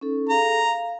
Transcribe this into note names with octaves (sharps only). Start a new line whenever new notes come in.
C#4 D#4 A4
G#4 A4 F5 A#5
F5